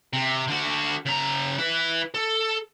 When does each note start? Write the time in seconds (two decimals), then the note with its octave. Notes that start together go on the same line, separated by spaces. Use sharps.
0.13 C3
0.48 D3 F#4
1.05 C#3 A#5
1.59 E4 B4
2.14 A4